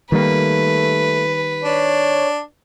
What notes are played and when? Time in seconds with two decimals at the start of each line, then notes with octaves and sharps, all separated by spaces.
0.12 D#3 G3 A3 A#3 B4
1.64 D4 C#5